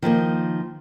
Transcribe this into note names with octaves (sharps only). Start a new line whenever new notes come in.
D#3 F3 A3 A#3